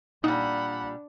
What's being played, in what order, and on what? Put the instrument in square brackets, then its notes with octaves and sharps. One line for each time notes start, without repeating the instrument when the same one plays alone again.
[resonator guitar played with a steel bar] A#2 G3 [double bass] D4 [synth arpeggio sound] D#4 [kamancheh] F#5 B5